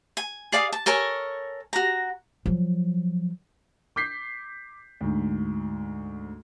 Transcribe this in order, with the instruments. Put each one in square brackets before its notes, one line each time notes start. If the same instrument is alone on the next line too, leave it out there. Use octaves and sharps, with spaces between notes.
[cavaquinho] G#5
G#4 D5 F5 D#6
A5
A4 A#4 C#5 G#5
F#4 A#5
[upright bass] F3 F#3
[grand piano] D6 G6 B6 C7
D2 G#2